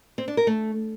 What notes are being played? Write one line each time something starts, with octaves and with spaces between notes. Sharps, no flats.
C4
D4
A#4
A3